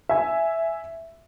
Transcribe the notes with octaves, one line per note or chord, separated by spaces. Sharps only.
E5 G#5